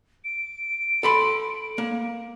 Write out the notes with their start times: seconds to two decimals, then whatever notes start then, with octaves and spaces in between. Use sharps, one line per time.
0.25 D7
1.03 A4 B5 C6
1.78 A#3